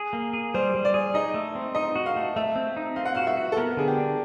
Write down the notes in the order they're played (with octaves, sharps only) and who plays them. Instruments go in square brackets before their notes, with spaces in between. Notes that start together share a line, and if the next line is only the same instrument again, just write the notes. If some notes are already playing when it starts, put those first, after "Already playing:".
Already playing: [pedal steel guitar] G#4
A#3
G#4
[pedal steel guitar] G3 [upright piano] C5
[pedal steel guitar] G3
[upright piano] D5
[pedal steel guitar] G#4
[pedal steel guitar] D#4 [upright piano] D#5
[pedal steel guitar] A3
C4
[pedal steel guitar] D#4 [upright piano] D#5
[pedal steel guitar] F#4
[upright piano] F5
[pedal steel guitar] A3
[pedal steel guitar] A3 [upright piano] E5
[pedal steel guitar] C4
D#4
[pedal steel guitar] C4 [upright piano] F5
[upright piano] F#5
[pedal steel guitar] F#4 [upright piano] F5
[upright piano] E5
[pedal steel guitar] F#4
[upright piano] A4
[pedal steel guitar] B3 [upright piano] A#4
[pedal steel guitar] D3 [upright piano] G#4
[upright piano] G4
[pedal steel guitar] D4